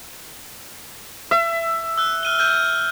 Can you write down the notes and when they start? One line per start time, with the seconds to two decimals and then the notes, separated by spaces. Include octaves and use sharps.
1.31 E5
1.98 E6 F#6
2.23 F6 D#7 G7
2.39 F6 G6 D#7